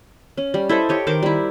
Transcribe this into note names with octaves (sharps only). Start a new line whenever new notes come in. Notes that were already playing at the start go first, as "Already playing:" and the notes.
C#4
G3
E4 A4 C5 D#5
G4 C#5 D#5
D#3 A#4 C5 D6
G3 E4